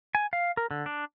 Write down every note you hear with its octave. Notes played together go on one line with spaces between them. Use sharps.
G#5
F5
A#4
D3
D4